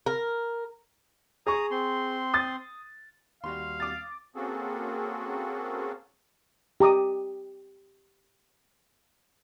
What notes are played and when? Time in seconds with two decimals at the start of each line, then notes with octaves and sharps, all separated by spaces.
0.06 A#4
1.47 G#4 A#5 C#6 D#6
1.71 C4 C6
2.34 D#6 A6
3.44 D#2 G3 F#4 F5 C6
3.80 D6 D#6 A6
4.36 A#3 C4 C#4 F#4 G#4 A4
6.80 G4 A#5 D6 D#6